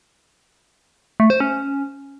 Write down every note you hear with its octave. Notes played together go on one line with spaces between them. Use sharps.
A3
C5
C#4